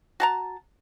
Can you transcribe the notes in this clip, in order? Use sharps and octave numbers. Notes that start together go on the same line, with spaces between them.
F#4 A5 A#5